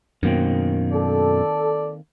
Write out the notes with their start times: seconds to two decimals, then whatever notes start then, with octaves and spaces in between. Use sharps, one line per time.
0.23 F#2 B2 D#3 A#3 C4
0.92 A4 D5